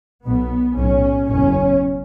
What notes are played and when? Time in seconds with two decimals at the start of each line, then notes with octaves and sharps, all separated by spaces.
0.24 B1 B2 B3
0.76 B1 A2 C#4
1.28 F#1 E2 B2 C#4